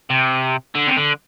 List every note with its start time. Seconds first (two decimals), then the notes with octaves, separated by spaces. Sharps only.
0.10 C3
0.75 D3
0.87 C3
0.97 D3